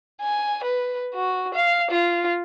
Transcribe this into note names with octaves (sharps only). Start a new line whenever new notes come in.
G#5
B4
F#4
F5
F4